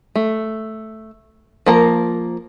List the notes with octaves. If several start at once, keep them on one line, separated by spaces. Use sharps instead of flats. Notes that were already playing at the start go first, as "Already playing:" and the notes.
A3
F3 A#3 A#4